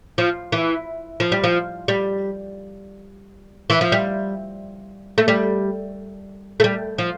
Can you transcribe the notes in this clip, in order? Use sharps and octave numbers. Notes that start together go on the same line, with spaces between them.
F3
E3
F3
G3
F3
G3
E3
F3
G3
A3
G3
A3
G3
F3